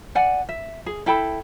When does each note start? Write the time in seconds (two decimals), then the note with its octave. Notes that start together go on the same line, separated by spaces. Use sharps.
0.15 D5 F#5 G#5
0.49 E5
0.86 G#4
1.06 E4 A4 G5 B5